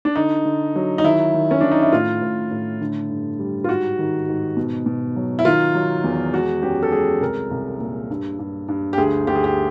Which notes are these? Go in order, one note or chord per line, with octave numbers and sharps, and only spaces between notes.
D4
D3 D#4
D3
F#3
D#4
D#3 E4
D#3
C#4
D#3 D4
D#4
E4
A2 F4
A2
A2
D3
G2
G3
F4
G#2 F#4
D#3
G#2
B2
B2
F#3
E4
D#3 F4
F#3
E2
G#3 F#4
F#2 G4
A4
G#3 G#4
C2 A#4
C2
A#2
G2
G2
G2
G4
D2 G#4
D2 G4
G#4
G4